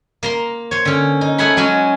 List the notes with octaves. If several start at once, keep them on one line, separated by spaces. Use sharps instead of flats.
A#3 A#5 C6
C5 C#5
D3 C#4
D#4
A3 G#4 C#5 F#5 B5
F#3 G#3 C#4 F#4